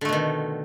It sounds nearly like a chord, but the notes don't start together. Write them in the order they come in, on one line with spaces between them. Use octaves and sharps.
D3 A3 B2 D#3